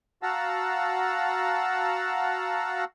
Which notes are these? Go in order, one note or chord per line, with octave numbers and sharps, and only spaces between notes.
F#4 F5 F#5 A5 A#5 E6